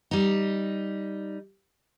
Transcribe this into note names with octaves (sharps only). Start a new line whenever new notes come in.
G3 D#4